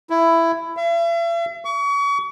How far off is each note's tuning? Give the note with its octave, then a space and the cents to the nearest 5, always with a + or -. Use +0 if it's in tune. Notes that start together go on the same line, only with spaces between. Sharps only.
E4 +10
E5 +45
C#6 +35